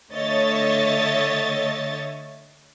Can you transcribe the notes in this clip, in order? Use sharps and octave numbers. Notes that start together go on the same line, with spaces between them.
D3 A3 C#5 D#5 E5 A6